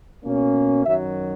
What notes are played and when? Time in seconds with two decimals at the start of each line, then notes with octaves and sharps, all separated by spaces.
0.25 B2 A#3 C#4
0.85 F#2 D#3 F#3 E5